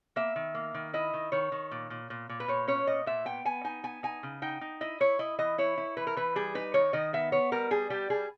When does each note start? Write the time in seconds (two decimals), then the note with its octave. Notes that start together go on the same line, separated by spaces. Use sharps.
0.16 A#3 E5
0.36 D#3
0.55 A#3
0.74 D#3
0.93 E4 D#5
1.14 D#3
1.32 D#3 C#5
1.52 D#3
1.71 A#2
1.90 A#2
2.10 A#2
2.29 A#2
2.40 B4
2.48 A#2 C#5
2.68 C#4 C#5
2.87 A#2 D#5
3.06 A#2 E5
3.25 B3 G5
3.45 B3 G#5
3.64 D#4 G#5
3.83 B3 G#5
4.03 D#4 G#5
4.23 C#3
4.42 D#4 G5
4.61 D#4
4.81 E4 D#5
5.00 E4 C#5
5.19 E4 D#5
5.39 E3 D#5
5.58 E4 C#5
5.77 E4
5.97 E3 B4
6.07 A#4
6.17 E3 B4
6.36 G3 G#4
6.55 D#4 B4
6.74 D#3 C#5
6.93 D#3 D#5
7.13 B3 E5
7.32 B3 C#5
7.52 G3 A#4
7.71 G3 G#4
7.90 G3 G4
8.10 G3 G#4